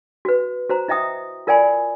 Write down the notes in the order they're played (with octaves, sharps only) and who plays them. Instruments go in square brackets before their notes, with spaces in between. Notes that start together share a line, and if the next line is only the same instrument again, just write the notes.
[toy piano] F#4 B4
F#4 C5 A#5
E4 D#5 E5 G5 D#6
F4 A#4 D5 G5 G#5 B5